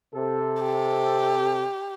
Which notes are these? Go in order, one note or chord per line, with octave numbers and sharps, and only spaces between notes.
C3 A4
G4